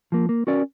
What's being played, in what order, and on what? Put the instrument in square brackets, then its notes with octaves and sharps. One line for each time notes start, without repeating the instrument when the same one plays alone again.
[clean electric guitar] F3 A#3
A#3
C#4 F#4 A#4 D5